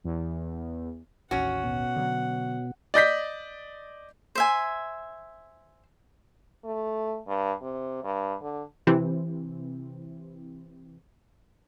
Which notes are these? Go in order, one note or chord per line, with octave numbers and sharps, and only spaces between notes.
E2
A1 D#2 C#4 F#4 F#5
B2
D3 F#3
D5 D#5 G6 B6
C5 E5 G#5
A3
G2
C3
G2
D3
C3 E3 C4